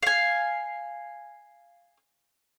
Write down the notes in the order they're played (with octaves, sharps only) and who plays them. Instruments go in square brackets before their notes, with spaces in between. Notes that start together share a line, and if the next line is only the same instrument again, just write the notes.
[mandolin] F5 G#5